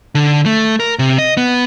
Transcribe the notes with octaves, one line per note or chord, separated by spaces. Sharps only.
D3
A3
A#4
C3
D#5
B3